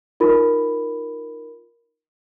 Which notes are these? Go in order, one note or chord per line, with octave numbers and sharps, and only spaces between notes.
D#4 F4 A#4 B5